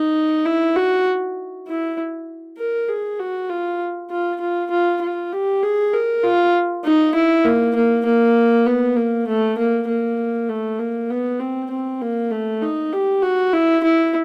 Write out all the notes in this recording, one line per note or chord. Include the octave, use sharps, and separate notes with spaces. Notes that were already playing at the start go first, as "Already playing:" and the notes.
Already playing: D#4
E4
F#4
E4
A#4
G#4
F#4
F4
F4
F4
F4
F4
G4
G#4
A#4
F4
D#4
E4
A#3
A#3
A#3
B3
A#3
A3
A#3
A#3
A3
A#3
B3
C4
C4
A#3
A3
D#4
G4
F#4
E4
E4